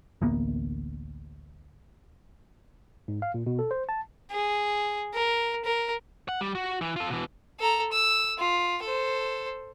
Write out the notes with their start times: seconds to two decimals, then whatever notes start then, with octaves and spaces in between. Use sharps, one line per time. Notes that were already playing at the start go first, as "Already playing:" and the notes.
0.22 A1 D2 A#3 B3
3.08 G#2
3.22 F5
3.34 A#2
3.46 B2
3.59 A4
3.71 C5
3.89 A5
4.31 G#4
5.14 A#4
5.65 A#4
6.29 F#5
6.41 G3
6.55 F#4
6.81 E3
6.96 F4 A4
7.10 B2 E3
7.59 A4 A#5
7.92 E6
8.38 F4
8.82 A4 C5